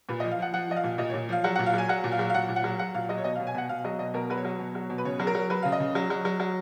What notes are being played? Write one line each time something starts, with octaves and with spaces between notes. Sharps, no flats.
A#2 B4
D#5
F3
F5
F3 F#5
F3 F#5
F3 D#5
F5
A#2
A#2 D#5
C#5
A#2
F3 F5
F#3 F#5
F#5
A#2
F5
F#3 G#5
F#3 F#5
A#2
F5
F#3
F5
A#2 F#5
A#2
F#5
F#3
F#3 F#5
A#2 F5
F#3 D#5
C#5
B2 D#5
F5
B2
G#5
B2 F#5
B2 F5
F#3 D#5
B2 D#5
B2 A#4
F#3 B4
C#5
F#3
B2
F#3
B2
B4
C#3 C#5
F#3 G#4
A#4
F#3
F#3 B4
C#3 F5
D#5
C#3
F#3
F#3
F#3
F#3